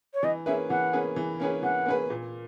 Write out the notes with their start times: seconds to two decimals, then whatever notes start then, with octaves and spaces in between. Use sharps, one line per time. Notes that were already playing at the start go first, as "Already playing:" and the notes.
0.13 C#5
0.23 E3 D#5
0.46 A#3 C#4 G#4 B4 E5
0.70 E3 F#5
0.93 A#3 C#4 G#4 B4
1.16 E3
1.40 A#3 C#4 G#4 B4
1.63 E3 F#5
1.86 A#3 C#4 G#4 B4
2.10 A#2